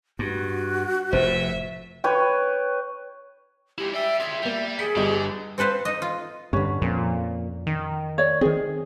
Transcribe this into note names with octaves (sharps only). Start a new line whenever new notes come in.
G2 F#4
F1 A2 C5 E5
B4 C#5 G5
G#3 E4 G4
D5 E5 G5
F4 G#4 E5
G3 A#3 F7
G#4 B6 C#7 D7
G1 D3 G3 D#5
C4 A4 B4 C5 F5
D#4 D#5
F4
G2 D3 C#4 B4
F2 A#2
D#3
C#5 D5
D#3 C4 G#4